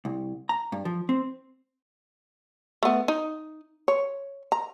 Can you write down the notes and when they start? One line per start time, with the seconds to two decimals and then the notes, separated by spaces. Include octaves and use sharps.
0.05 C2
0.49 A#5
0.72 G2
0.85 F3
1.09 C4
2.83 A3 B3
3.08 D#4
3.88 C#5
4.52 A#5